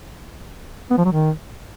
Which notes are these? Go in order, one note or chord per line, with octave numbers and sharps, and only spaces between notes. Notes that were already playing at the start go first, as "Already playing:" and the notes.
B3
F3
F#3
D#3